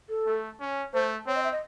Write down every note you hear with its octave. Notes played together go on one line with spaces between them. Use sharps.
A4
A3
C#4
A3 C5
C4 C#5
D#5
E5
D#5